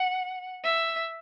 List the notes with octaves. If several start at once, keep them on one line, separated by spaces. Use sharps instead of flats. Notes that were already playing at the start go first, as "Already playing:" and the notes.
Already playing: F#5
E5